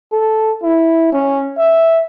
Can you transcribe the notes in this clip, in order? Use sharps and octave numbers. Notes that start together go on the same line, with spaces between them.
A4
E4
C#4
E5